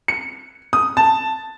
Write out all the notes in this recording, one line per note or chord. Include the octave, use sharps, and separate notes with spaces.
C#7
D#6
A5